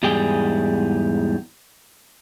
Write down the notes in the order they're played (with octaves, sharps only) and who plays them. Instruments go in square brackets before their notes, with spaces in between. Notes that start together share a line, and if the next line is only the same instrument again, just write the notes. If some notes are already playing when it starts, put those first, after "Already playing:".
[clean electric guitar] E2 G#2 G3 G4 G#4 G5